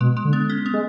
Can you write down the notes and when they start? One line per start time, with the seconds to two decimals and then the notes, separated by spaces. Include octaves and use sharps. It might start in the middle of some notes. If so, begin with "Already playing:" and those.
0.01 B2 G#3
0.17 G#3
0.25 D3
0.33 B3
0.50 C#4
0.66 B3
0.74 G#3